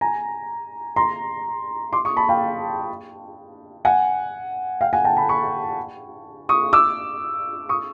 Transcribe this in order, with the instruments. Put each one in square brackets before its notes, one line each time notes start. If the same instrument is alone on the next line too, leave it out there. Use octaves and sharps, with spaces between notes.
[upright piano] G#5 A#5
A#5 C6
C6 D6
C#6 D#6
A5 B5
F5 G5
F#5 G#5
F5 G5
F#5 G#5
G5 A5
A5 B5
B5 C#6
C#6 D#6
D6 E6
C#6 D#6